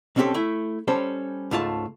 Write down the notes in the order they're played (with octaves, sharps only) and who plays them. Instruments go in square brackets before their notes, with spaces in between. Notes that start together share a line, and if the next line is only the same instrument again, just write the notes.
[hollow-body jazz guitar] B1 C4 C#4 F4 G4 A4
A3 E4
G3 C#4 A4 C5
C#2 G#2 A3 F4 G4 A5